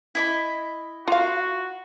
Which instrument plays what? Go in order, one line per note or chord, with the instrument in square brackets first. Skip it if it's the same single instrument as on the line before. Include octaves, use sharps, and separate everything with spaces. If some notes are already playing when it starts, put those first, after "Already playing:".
[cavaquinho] E4 D#5 B5
[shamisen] F4 F5 [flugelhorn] F#4